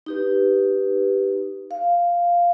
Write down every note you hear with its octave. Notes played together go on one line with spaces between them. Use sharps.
D#4 G4 B4
F5